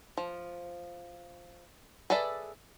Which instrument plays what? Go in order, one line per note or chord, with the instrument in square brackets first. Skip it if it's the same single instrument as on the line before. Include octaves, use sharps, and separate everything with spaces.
[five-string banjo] F3
G#4 A4 B4 D5 E5